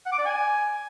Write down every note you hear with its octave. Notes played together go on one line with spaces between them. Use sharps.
F#5
D6
D5
G#5